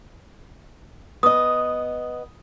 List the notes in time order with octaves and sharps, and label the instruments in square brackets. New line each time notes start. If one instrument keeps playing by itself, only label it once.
[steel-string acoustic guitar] B3 D#5 [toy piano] D#6